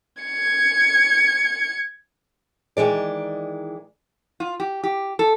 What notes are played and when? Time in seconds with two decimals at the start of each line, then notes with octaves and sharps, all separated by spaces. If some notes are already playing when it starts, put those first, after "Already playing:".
0.22 G#6 C#7
2.77 D#3 E3 G#3 D5
4.40 F4
4.60 G4
4.83 G4
5.19 A4